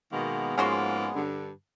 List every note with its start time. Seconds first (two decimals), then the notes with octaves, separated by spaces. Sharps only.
0.12 B2 D#3 G#3 A#3 B3
0.58 G#2 F3 A#3 C#4 F#4 C6
1.15 G2 D3